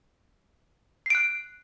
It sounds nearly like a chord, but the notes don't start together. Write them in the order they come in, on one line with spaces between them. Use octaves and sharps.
C7 D7 F#6